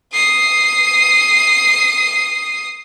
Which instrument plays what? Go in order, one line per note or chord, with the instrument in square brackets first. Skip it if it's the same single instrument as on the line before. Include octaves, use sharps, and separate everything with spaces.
[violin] D#6 C7